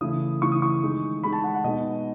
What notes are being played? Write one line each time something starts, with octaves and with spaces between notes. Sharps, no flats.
C#3 E3 A3 E4 D#6
C#3 E3 A3 E4 C#6
D#6
C#6
D#3 G#3 D#4
D#3 G#3 D#4 B5
A5
F#5
F#5
B2 G#3 D#4 D#5